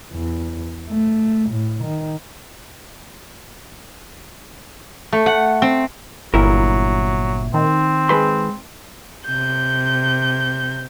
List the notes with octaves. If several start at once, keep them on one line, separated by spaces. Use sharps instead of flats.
E2
A3
A2
D#3
A3
F#5
C4
G1 A#2 F#3 E4 A#4
D#3 C4
G#3 B4 C6
C3 G6